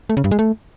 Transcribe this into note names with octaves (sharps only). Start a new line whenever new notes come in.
A3
C#3
G2
G#3
A3